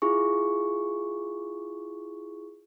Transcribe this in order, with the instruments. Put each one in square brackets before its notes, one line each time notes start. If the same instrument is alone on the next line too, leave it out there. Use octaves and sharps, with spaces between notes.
[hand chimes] E4 F4 G#4 C#6